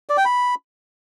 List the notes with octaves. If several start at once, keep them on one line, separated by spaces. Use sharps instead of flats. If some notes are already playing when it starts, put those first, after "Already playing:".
D5
G5
B5